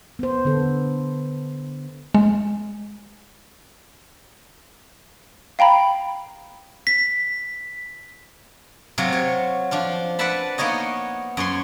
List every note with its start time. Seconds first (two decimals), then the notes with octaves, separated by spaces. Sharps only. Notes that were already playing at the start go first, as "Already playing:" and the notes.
0.19 B3 C5
0.45 D3 B3 A4
2.15 G#3
5.59 F5 G5 A#5 B5
6.87 B6
8.98 C3 F#3 F4
9.12 C#5
9.71 F3 D4 F4
10.19 B4 D5 E5 F#5 A5 B5
10.58 A#3 B3 D#4 C#5 D#5
11.37 F#2 C#5 C6